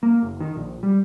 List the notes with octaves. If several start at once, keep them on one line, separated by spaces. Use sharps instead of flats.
A#3
F#1
D#3
A#1
G3